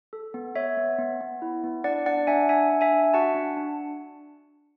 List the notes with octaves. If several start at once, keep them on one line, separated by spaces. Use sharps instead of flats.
A4
B3
B3 C#5 E5
B3
B3
B3
E4
B3
D4 D5 F#5
D4 D5 F#5
D4 E5 G#5
D4 E5 G#5
D4
E5 G#5
D4
F#4 F#5 A5
D4
D4